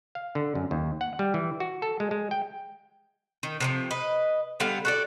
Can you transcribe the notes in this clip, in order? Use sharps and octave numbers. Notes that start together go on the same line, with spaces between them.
F5
D3
F#2
D#2
F#5
G3
E3
F#4
A4
G#3
G#3
G5
D#3
C3 D#3 F3
B4 D#5
D3 G3 B3 F5
F#4 A4 D5